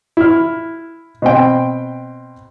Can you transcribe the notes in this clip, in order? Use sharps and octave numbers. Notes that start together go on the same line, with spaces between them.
E4 F6
B2 C4 G5